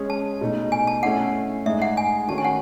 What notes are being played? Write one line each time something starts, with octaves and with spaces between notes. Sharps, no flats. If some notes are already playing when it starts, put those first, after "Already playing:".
Already playing: G#3 C#4 G#4 C#5
A5
B2 A3 D#4
G#5
A5
A3 C#4 E4 F#5
A2 G#3 D#4 G#4 D#5 E5
F#5
G#5
D#3 A3 C#4 F#4 C#5 A5
G#5
F#5